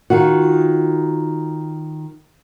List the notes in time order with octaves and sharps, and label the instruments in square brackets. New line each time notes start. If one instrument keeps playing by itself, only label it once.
[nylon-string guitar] D#3 F4 F#4